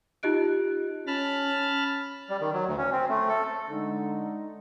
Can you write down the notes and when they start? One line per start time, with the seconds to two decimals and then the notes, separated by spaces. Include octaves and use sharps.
0.23 D#4 F4 G4 D#5 F#6 D7
1.07 C#4 A5 B5 F6
2.29 G3
2.41 D#3
2.54 F#3
2.67 D2
2.78 C#4
2.92 C4
3.09 A3
3.29 A4
3.70 D3 G#3 D#4